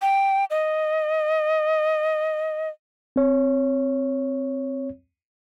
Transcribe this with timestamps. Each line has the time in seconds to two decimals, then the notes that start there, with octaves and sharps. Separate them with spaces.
0.02 G5
0.50 D#5
3.16 C4 C#5